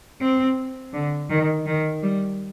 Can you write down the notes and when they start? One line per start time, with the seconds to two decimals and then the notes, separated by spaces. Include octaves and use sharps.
0.21 C4
0.94 D3
1.30 D#3
1.67 D#3
2.03 G3